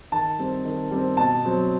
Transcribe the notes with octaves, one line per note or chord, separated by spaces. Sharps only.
D#3 A5
G3 C4
D#3
G3 C4
B2 A5
F#3 C4